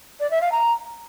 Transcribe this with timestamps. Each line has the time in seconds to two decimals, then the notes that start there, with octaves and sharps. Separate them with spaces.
0.19 D5
0.30 E5
0.41 F5
0.51 A#5